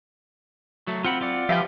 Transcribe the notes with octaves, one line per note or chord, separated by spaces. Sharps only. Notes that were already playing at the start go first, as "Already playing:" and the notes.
F#3 A3
C4 F4 F#5 B5
F4 D5 F#5
F3 G4 B4 E5 F5 G5